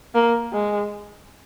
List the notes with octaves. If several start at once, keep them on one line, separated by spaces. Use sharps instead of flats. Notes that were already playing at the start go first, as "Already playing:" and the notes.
A#3
G#3